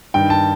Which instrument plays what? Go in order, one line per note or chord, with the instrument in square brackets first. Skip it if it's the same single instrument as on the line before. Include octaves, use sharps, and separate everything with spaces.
[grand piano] G2 D#3 G5
A5